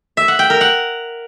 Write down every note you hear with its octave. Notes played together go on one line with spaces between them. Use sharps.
E5
F#5
G5
A#4
F#5